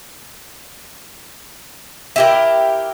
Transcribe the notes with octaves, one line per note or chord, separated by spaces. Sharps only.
E4 G4 A#4